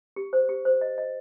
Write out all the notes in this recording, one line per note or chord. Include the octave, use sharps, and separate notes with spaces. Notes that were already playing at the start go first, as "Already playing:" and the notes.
G4
C5
G4
C5
D#5
D#5